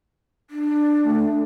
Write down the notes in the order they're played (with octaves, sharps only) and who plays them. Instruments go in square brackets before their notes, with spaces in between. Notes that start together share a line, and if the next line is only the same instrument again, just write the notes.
[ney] D4
[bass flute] A3